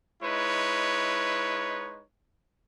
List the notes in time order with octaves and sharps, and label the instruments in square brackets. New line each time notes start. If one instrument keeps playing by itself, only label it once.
[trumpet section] G#3 D#4 E4 B4 C#5